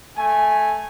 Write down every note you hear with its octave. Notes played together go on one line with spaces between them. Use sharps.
A3 G#5